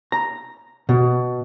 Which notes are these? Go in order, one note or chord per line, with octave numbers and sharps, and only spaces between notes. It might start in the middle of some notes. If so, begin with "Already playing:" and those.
A#5
B2